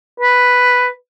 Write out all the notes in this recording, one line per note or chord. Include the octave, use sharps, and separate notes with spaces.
B4